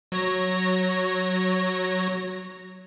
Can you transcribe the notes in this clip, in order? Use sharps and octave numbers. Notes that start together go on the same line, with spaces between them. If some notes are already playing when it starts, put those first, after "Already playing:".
F#3 C#5 A#6